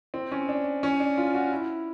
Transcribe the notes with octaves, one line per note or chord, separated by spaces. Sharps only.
C4
C#4
D4
C#4
D4
F4
F#4
E4